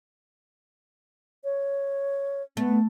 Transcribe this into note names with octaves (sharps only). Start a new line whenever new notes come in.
C#5
A3 B3